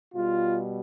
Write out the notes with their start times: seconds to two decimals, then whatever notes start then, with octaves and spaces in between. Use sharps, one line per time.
0.14 B2 G3 F4